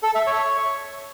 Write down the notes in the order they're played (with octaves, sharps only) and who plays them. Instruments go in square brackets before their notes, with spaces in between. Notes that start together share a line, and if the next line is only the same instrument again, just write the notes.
[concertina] A4
E5
C#5